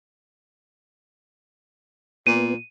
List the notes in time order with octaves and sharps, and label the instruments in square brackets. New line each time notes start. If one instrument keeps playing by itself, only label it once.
[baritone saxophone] A#2 [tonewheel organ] B3 [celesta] D#7